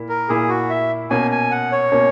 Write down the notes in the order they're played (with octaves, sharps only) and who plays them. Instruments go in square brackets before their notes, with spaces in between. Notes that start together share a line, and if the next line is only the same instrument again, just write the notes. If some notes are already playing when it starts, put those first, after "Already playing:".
Already playing: [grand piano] A#2 A#3 E4
[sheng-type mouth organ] A#4
[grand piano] A#2 A#3 E4 [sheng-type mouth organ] G#4
[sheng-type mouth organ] F#4
E5
[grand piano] B2 A#3 C#4 [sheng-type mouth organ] G#5
[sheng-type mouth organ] G#5
F#5
C#5
[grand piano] B2 A#3 C#4